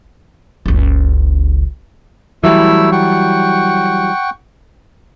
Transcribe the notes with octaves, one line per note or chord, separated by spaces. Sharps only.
F#1 C#2
E3 F#3 G3 A3 E4 E6
F#5 G5 C#6